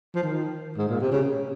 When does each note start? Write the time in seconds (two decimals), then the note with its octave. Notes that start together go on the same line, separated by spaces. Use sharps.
0.15 F3
0.23 D#3
0.77 G#2
0.89 A#2
1.00 C3
1.11 C#3